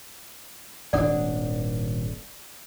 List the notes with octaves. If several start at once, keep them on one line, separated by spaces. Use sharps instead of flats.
D#1 G#1 D4 D5 F#5 D#6